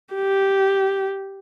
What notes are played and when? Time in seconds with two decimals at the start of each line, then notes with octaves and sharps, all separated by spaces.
0.14 G4